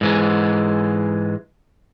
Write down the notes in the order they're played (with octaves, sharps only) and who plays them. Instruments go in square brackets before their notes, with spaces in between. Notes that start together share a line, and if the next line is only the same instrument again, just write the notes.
[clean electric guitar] G#2 E3 G#3